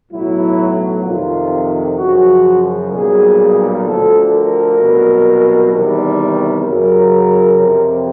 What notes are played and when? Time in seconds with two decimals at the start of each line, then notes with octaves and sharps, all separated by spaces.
0.11 B1 A2 F#3 E4
1.04 F2 C3 D#3 F4
1.97 F#2 C#3 F3 F#4
2.90 B1 A#2 G3 G#4
3.84 D2 D3 F3 A4
4.30 A#4
4.78 C2 B2 F#3
5.71 E2 C3 D#3 G3
6.64 F#2 C#3 F#3 A#4
7.58 F2 C3 F3